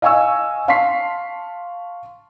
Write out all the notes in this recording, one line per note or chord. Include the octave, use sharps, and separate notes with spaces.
D#5 F5 G#5 C#6 E6
F5 A5 C6 C#6 B6 C7